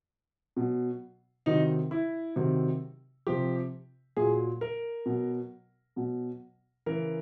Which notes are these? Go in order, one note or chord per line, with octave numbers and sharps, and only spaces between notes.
B2 F#3
C3 D#3 F#3 D#4
E4
C3 D#3 F#3
C3 F3 G4
A#2 F#3 G#4
A#4
B2 F#3
B2 F#3
C#3 E3 A#4